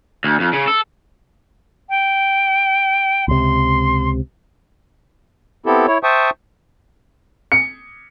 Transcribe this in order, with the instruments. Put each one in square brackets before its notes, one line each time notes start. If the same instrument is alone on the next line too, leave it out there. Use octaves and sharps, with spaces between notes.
[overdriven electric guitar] D2
F2
C#3
A4
[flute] G5
[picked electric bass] C#2 C3 [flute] C6
[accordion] B3 C4 E4 G4 A4
E4 C#5
C5 E5 G5 A5 C#6 D#6
[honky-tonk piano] C#7